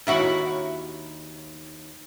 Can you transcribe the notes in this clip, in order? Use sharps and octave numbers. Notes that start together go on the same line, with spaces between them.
D#2 E4 F#4